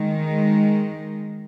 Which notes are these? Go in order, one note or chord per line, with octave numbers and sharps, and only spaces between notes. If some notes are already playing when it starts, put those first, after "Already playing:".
Already playing: D#3 G#3